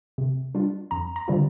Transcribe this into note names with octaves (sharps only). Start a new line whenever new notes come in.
C3
G3 D4 F4
F2 A#5
A#5
D3 G3 C4 F4